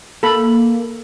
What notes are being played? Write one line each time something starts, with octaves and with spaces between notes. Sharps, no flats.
A#3 A4 B5